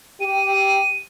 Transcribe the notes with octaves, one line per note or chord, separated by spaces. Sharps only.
G4 D#7